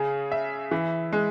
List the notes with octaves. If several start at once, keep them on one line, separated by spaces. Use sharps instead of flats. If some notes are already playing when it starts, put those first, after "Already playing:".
Already playing: C#3 G#4
E5
E3
G#3